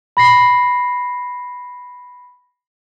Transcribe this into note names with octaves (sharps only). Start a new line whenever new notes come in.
B5 A#6 C7